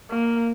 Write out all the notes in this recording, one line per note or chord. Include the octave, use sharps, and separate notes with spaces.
A#3